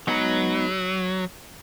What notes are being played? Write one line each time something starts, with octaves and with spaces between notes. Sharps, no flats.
F#3 G#3 B3 D#4 G#4 B4